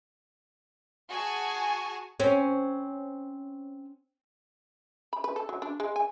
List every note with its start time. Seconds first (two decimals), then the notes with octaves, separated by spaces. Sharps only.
1.10 F#4 G#4 G#5 A5 C#6
2.20 C4 C#4
5.13 B5
5.24 B4
5.36 A4
5.49 F#3
5.62 D4
5.80 G#3
5.96 G#5